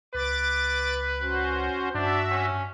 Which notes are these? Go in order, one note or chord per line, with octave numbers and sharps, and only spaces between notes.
C#2 B4 D6 A6
C#4 F#4 C5
G2 D4 F#4 E5
C#4